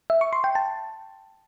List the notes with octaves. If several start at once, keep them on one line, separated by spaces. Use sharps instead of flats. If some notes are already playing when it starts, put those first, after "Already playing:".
E5
C#6
C6
G5
A5